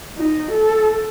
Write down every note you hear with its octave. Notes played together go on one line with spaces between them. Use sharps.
D#4
A4